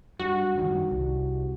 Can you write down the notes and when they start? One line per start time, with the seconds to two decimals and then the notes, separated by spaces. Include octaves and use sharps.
0.19 G2 F#4
0.55 F#1 G2 D#3
0.91 C2